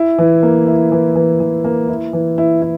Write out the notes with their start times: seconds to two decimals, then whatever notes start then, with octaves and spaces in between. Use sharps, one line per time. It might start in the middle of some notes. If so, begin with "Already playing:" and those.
Already playing: E4
0.18 E3
0.43 A#3
0.67 E4
0.92 E3
1.15 E3
1.40 E3
1.64 A#3
1.89 E4
2.13 E3
2.38 E4
2.62 E4